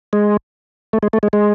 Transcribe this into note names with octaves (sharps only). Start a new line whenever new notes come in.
G#3
A3
G#3
A3
G#3
G#3